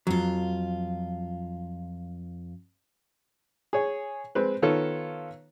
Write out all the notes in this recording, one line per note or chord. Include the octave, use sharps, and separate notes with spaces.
F2 F#3 F4
G#4 C#5
G#3 C4 B4
D#3 B3 F4 A4 C#5